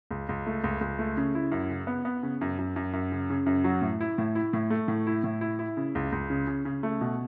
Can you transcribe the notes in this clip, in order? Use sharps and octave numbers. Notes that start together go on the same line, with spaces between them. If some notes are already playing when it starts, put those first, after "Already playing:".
C#2
C#2
A3
C#2
C#2
A3
C#3
E4
F#2
C#3
B3
B3
C#3
F#2
F#2
F#2
F#2
C#3
C#3
F#2
F#3
A2
E4
A2
E4
A2
A3
A2
E4
A2
E4
E4
C#3
C#2
C#2
C#3
C#3
C#3
A3
B2